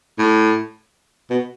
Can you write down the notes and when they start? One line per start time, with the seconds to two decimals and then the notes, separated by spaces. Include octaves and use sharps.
0.19 A2
1.30 B2